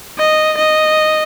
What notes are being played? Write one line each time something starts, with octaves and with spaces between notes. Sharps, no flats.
D#5
D#5